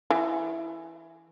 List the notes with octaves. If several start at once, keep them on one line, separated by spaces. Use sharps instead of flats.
E3